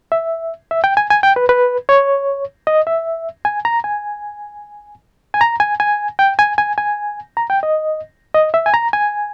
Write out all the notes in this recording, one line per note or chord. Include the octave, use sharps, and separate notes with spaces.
E5
E5
G5
G#5
G#5
G5
B4
B4
C#5
D#5
E5
G#5
A#5
G#5
G#5
A#5
G#5
G#5
G5
G#5
G#5
G#5
A#5
G5
D#5
D#5
E5
G#5
A#5
G#5